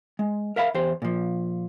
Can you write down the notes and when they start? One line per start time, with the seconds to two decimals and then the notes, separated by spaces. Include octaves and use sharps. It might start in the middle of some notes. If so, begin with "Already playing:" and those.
0.19 G#3
0.56 A#4 E5 F5 B5
0.74 E2 G4 C5
1.02 A#2 F3